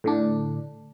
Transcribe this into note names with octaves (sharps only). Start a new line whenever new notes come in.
A2 D3 D4